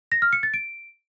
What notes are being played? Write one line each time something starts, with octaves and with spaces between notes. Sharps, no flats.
A#6
F6
C#7
A6
D7